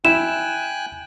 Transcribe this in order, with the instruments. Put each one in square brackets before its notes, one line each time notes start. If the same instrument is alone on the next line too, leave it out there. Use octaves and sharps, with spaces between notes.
[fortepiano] E4 [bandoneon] G5 G#5 F#6 [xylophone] E7